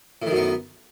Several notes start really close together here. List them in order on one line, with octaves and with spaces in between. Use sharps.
A2 D#3 F#2 B3